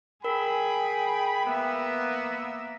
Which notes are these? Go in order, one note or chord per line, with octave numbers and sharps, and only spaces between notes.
G#4 A#4 G5 B5
A#3 B3 E5